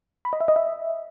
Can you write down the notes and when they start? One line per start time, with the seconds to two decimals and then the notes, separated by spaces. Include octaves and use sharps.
0.25 B5
0.33 D#5
0.41 E5
0.48 D#5
0.56 E5